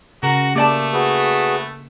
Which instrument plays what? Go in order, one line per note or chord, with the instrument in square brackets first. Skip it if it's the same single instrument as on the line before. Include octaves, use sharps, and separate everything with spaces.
[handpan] C#3 [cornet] F#4 [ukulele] A#4
[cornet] A3 [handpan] A#3 [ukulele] G4 D5 A5
[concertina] F#4 G#4 B4